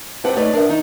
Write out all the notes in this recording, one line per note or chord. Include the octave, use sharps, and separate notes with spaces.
G2 C4 G4 B4 F#5 A5
A3 D#4 B4 C#5 D5
D4 A#4 B4 E5 F#5
D#3 D#4